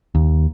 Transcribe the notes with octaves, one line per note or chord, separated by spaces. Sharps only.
D#2